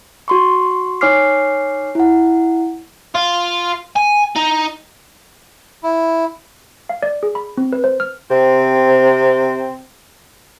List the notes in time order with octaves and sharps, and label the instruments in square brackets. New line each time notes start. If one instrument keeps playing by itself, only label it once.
[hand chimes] F#4 C6 C#6
D#4 C#5 G#5 D6 F6 C7
E4 F#5
[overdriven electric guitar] F4
G#5
D#4
[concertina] E4
[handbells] F5
D5
G#4
B5
C4
B4
C5
F6
[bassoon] C3 [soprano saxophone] C4